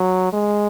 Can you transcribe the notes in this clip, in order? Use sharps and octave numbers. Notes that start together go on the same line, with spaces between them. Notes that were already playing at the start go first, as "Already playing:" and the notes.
Already playing: F#3
G#3